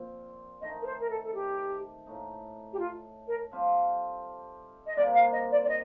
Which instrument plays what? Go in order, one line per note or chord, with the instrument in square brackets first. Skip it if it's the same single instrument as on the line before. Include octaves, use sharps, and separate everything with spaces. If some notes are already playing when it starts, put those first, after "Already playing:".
Already playing: [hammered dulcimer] A#2 F3 C4
[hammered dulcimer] D#3 A3 D#4 [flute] D#5
[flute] A#4
C5
A#4
A4
A4
G4
[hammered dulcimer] A2 A3 D#4
[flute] G4
F4
A#4
[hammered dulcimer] G3 C4 F4 A4
[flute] D#5
[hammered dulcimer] C3 D#3 G3 A#3 [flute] D5
[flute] F5
D#5
D5
D5
D#5